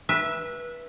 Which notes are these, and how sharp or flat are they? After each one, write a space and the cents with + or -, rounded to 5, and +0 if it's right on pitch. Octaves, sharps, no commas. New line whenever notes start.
B4 -25 E5 +0